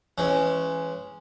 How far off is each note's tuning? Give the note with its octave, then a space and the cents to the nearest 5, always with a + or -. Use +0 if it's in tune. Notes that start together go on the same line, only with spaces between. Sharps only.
E3 +20 G#3 +0 C#4 +0